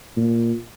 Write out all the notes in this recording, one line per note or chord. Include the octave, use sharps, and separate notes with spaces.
A#2